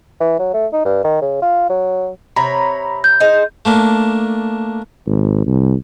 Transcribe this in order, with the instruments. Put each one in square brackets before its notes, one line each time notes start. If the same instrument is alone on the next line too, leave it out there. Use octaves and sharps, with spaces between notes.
[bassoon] E3
F#3
A3
D#4
G2
D#3
C#3
F4
F#3
[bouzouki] C3 C#5 [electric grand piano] A#5 B5
[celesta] G6
[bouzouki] D#4 G#4 C5
[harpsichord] A3 A#3 D4
[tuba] G#1
C2